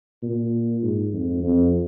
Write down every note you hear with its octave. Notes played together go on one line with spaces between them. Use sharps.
A#2
G#2
F2
F2